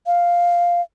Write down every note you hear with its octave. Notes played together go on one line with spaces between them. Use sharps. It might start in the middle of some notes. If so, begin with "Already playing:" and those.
F5